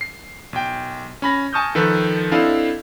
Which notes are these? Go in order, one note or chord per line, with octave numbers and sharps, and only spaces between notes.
C7
B1 G5
C#4 B5 A#6
G#5 A5 C#6 D#6 F6 G6
D#3 F3 A4 B4
C4 D4 E4 A4 D#5 F5